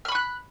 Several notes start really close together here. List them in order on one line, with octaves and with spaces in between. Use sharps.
F6 B5 C#6 F#6